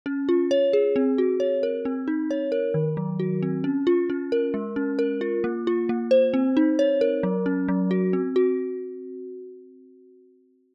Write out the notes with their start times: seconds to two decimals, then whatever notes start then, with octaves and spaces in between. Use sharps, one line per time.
0.06 C#4
0.29 F4
0.51 C#5
0.73 G#4
0.96 C4
1.18 F#4
1.40 C#5
1.63 A#4
1.85 C4
2.08 D#4
2.31 C#5
2.52 A#4
2.74 D#3
2.97 F#3
3.20 F#4
3.43 C4
3.64 C#4
3.87 F4
4.10 C#4
4.32 A#4
4.54 G#3
4.76 C#4
4.99 A#4
5.21 F4
5.44 A#3
5.67 F4
5.89 A#3
6.11 C5
6.34 C4
6.57 D#4
6.79 C#5
7.01 A#4
7.23 F#3
7.46 C#4
7.68 F#3
7.91 F#4
8.13 C4
8.36 F#4